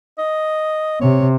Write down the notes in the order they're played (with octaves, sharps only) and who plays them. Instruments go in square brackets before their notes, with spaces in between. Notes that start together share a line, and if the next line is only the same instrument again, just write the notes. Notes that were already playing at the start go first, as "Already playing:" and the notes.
[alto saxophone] D#5
[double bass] C3 [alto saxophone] C#5